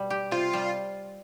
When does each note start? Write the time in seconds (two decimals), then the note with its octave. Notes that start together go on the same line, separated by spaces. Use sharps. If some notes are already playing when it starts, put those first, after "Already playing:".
Already playing: B2 G3
0.10 G4
0.31 C3 F4
0.53 G3